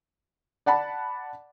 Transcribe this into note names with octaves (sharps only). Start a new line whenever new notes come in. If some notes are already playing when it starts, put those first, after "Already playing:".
D5 F#5 A5 B5